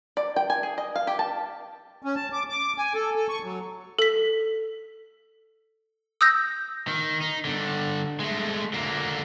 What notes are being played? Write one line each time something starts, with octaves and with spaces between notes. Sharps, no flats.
D5
G5
G#5
G#4
D#5
F5
G4
A5
C#4
A5
D6
D6
G#5
A4
A4
C#6
F#3
A4 B6
D#6 E6 G6 A#6
D#3
D#4
G2 D3
G#3 A3
D3 A#3